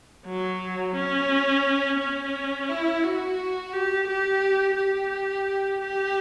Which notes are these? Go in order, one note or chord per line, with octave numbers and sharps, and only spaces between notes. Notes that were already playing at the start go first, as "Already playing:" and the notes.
F#3
C#4
C#4
E4
F#4
G4
G4
G4
G4